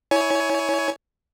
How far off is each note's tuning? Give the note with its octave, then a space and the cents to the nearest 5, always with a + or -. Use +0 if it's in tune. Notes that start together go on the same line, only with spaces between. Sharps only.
E4 -20 C#5 +15 G#5 +15